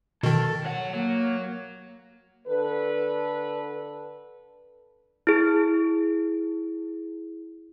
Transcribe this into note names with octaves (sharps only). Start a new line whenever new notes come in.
B2 D#3 A4
F#3 F#5
F#3 A#3
D3 A4 B4
E4 G#4